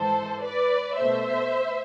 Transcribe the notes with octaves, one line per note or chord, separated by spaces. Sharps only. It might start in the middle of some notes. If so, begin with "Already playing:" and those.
Already playing: G#2 E3 A4 C5
B4 D5
B2 A3 C5 E5